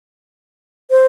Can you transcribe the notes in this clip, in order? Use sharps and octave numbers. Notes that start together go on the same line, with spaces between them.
C5